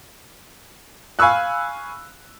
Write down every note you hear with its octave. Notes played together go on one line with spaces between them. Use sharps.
F5 G#5 B5 C#6 E6 F#6